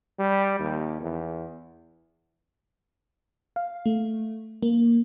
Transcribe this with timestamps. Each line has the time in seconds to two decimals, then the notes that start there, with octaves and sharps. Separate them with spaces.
0.19 G3
0.59 D#2
1.01 E2
3.56 F5
3.86 A3
4.63 A#3